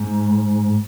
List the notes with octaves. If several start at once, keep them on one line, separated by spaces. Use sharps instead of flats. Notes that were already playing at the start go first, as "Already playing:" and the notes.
Already playing: G#2